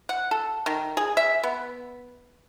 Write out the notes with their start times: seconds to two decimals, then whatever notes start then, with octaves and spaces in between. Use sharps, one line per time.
0.09 F#5
0.31 A4
0.66 D#3
0.97 G#4
1.17 E5
1.43 B3